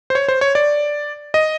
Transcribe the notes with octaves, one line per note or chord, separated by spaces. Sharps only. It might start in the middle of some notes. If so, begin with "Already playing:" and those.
C5
C#5
C5
C#5
D5
D#5